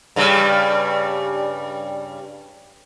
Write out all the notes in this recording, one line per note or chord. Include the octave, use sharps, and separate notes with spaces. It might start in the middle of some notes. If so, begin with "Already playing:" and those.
G2 C#3 G3